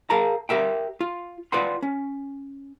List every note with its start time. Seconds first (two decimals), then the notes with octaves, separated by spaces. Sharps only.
0.10 G#4 A#4 F5 A5 A#5
0.49 G4 A#4 E5 G5
1.01 F4
1.52 F4 B4 D5 F#5 G5 C6
1.82 C#4